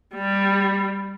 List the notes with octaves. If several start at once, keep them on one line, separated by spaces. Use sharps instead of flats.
G3